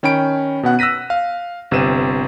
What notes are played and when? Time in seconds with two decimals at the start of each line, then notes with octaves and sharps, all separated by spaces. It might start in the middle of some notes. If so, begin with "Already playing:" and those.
0.03 D#3 C#4 G5 B5 D7
0.63 B2 B3 F#5 F#6
0.79 E6 F#6 A#6 B6 D#7
1.10 F5
1.71 G1 C3 B4 C5 D#7 E7